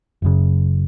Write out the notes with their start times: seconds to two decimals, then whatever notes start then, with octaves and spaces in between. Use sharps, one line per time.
0.22 F#1 F#2 C#3